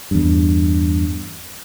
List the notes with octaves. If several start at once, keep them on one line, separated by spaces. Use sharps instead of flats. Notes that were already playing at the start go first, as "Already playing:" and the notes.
E2 G2